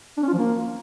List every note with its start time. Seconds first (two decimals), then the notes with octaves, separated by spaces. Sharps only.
0.18 D4
0.23 C#4
0.28 F4
0.33 F3
0.38 A#3